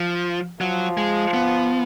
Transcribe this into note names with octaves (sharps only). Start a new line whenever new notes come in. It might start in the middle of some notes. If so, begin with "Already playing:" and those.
Already playing: F3
F3 F#3
G#3
B3